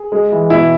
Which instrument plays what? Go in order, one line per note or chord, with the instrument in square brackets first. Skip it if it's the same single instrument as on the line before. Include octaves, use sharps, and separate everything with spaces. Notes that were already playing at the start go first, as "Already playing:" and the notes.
Already playing: [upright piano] G#4
[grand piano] G#3
E3
[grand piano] B2 [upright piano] E4